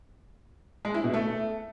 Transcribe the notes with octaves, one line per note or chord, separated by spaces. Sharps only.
G#3
E4
B2
A3